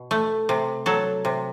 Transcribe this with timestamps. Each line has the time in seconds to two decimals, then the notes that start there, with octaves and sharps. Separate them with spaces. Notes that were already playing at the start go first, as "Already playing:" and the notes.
Already playing: B2
0.11 A3
0.49 C3
0.86 F#3 A4
1.25 C3